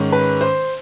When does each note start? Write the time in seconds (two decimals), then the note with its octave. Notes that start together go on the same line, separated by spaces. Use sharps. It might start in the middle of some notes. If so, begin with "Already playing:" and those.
Already playing: G#2 D#3 G#3 C#4
0.12 B4
0.41 C5